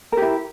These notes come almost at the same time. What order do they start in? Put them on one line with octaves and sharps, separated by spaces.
A#4 G4 E4